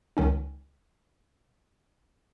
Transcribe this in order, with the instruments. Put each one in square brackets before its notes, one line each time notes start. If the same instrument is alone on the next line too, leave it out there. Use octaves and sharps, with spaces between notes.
[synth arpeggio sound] C#2 D#3 C#4 D#4